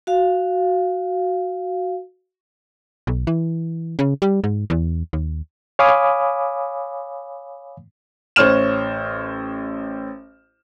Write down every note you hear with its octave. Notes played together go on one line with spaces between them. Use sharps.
F#4 F5
B1
E3
C#3
G3
G#2
E2
D#2
C#5 F5 G#5 B5 D6 D#6
A1 C5 C#5 F6 E7